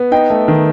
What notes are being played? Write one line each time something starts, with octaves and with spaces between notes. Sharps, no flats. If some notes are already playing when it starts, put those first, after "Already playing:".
Already playing: B3
D#4 G5
A3
D#3